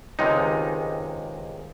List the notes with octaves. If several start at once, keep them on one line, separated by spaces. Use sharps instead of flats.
C#2 C3 D#3 G#3 D#4